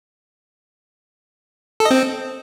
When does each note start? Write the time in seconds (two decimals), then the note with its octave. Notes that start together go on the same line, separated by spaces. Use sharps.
1.80 A4
1.85 D#5
1.91 C4